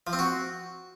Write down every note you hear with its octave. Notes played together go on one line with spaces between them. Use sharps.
F3
C4
F#4